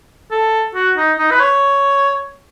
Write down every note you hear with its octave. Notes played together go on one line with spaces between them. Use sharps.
A4
F#4
D#4
D#4
B4
C#5